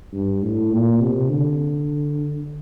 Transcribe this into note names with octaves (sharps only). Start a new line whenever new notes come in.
G2
A2
A#2
C3
D3